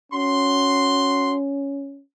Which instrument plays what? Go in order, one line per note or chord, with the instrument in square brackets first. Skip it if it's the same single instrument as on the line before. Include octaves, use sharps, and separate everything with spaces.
[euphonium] C#4 [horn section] F#4 C6